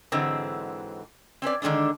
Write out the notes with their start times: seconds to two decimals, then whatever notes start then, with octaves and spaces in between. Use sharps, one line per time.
0.12 G#2 D3 E3 F#3 G#3 C4
1.42 C4 C#4 B4 D5
1.62 D3 D#3 G#3 C#4 D4